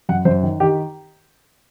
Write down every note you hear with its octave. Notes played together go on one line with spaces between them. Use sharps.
F#2 F#5
F#2 C5
D#3
D#3 G4